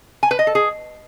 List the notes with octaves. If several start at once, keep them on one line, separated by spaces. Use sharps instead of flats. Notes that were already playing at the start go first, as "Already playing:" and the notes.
G#5
B4
D#5
A4
G#4